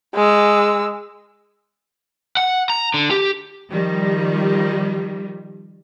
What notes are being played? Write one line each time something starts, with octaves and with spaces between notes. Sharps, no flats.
G#3 E6
F#5
A#5
D3
G4
D#3 F3 G3